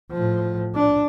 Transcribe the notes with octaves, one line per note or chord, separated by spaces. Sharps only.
A2 F3
D4